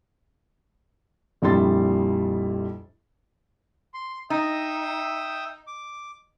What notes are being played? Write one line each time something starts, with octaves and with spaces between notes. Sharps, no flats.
A#1 F2 G3 E4 C6 A6
C6
D#4 E5 G5 D#6
D6